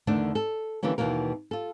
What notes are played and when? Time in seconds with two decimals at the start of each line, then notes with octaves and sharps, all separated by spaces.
0.07 E2 D3 D#3 A3 D4
0.35 A4
0.83 D3 E3 G3 A#3 C#4
0.98 D#2 B2 E3 A#3 A#4
1.51 F4 A4